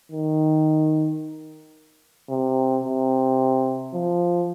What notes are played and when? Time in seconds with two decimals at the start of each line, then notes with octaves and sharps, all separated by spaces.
0.12 D#3
2.30 C3
2.85 C3
3.93 F3